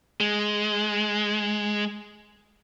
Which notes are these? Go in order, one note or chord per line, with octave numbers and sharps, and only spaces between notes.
G#3